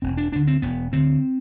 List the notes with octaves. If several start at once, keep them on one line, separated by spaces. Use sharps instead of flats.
E1 C4
D4
D2 D3 D4
C4
E1 B3
D2 D3 C4